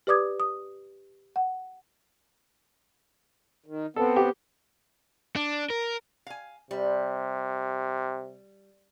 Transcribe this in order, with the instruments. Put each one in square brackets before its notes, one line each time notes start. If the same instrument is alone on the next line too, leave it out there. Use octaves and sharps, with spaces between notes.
[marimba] G4 B4 D5 D6 D#6 G#6
D#6
F#5
[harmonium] D#3
[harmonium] B3 C4 [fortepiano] A4
[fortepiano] G4
[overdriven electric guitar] D4
A#4
[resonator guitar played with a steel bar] F5 G#5
[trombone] C3 [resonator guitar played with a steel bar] G3